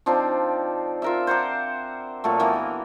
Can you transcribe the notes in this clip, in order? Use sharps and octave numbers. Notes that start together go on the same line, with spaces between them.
F3 C4 D4 D#4
F4 A#4 E5
C5 F#5 A#5 D6
A#2 F#3 A3
E3 A#3 B3